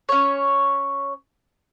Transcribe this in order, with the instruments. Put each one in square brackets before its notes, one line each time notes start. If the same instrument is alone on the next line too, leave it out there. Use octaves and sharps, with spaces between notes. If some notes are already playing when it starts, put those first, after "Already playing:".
[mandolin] C#4 C#5